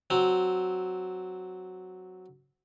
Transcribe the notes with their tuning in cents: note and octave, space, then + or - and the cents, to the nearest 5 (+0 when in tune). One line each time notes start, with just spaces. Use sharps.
F#3 +0 C4 +0